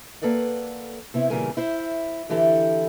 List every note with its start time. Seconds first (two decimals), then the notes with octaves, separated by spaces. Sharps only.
0.22 A#3 A4 B4 D5 F#5
1.14 C3 B3 E4
1.30 A#2 C#3 E3 G3 A#4 G#5
1.57 E4 C5 E5
2.29 D3 E3 E4 G4 A4